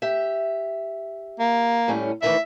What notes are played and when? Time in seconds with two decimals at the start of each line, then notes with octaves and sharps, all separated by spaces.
0.02 G4 E5
1.40 A#3
1.88 A2 G3 C#4
2.22 D2 D#3 E3 E5